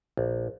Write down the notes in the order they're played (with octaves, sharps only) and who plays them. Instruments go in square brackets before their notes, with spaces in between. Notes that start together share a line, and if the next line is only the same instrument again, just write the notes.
[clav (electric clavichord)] A#1